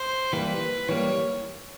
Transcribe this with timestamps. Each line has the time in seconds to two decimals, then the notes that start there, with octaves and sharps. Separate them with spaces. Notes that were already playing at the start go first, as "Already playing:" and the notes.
Already playing: C5
0.32 E3 G3 A#3 B4
0.89 E3 G3 A#3 C#5